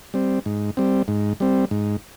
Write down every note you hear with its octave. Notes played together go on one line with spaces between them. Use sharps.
G3 C4
G#2
G3 C4
G#2
G3 C4
G#2